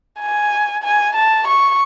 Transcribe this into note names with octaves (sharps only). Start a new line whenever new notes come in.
G#5
G#5
A5
C#6